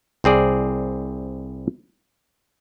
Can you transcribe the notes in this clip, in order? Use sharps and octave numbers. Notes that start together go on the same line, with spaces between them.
C2 C4 G#4 D5